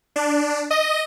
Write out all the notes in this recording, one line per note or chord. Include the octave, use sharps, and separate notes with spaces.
D4
D#5